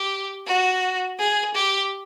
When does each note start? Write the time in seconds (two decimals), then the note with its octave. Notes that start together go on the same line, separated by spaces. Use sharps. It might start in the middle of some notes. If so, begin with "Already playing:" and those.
Already playing: G4
0.46 F#4
1.18 G#4
1.54 G4